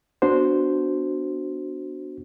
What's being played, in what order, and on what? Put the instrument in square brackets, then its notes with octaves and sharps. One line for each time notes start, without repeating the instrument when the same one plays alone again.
[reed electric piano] B3 D4 F#4 C5